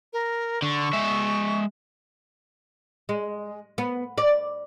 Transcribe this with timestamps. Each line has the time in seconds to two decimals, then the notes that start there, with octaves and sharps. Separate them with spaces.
0.13 A#4
0.62 D3 C#6
0.93 G#3 E5
3.09 G#3
3.78 B3
4.18 D5